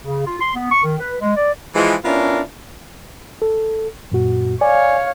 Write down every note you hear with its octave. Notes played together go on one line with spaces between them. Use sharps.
C#3
F4
C6
B3
C#6
D#3
B4
G#3
D5
E3 F3 G#3
B3 C#4 D4 E4 F4 A#4
A4
F#2 A#2 F#4
C#5 D5 F5 G#5